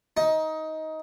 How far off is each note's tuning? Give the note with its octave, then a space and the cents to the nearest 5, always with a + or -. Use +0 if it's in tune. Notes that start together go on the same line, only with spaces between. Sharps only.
D#4 +20